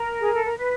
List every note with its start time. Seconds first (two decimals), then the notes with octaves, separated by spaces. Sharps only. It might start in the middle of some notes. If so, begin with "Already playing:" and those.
Already playing: A#4
0.20 G#4
0.32 A4
0.44 A#4
0.57 B4